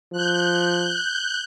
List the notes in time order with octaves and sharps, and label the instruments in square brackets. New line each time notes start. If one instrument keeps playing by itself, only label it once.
[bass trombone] F3 [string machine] F#6 G6